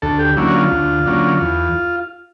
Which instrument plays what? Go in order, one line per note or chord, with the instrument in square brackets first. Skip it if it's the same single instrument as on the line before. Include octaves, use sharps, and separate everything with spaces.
[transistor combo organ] D2 A4
G4
D3 F#3 A#3 C#4 E4
F#4
F4
D2
D3 F#3 A#3 C#4
E2